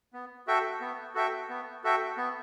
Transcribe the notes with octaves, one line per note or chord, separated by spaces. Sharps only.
B3
F#4 A4 E5 G5
B3
F#4 A4 E5 G5
B3
F#4 A4 E5 G5
B3